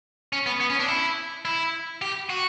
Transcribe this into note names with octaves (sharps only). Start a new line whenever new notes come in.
C#4
B3
B3
C#4
D4
E4
E4
G4
F#4